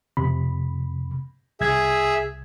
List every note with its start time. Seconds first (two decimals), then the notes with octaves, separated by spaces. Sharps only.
0.17 F2 C3 B5
1.61 C2 G#4 E5 G#6